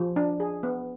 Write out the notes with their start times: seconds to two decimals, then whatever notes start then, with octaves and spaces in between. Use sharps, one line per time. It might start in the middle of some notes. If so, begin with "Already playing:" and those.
Already playing: F3
0.16 D4
0.40 G#4
0.63 B3